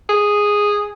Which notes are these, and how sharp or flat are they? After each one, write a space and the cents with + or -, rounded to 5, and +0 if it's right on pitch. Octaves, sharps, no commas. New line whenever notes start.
G#4 -5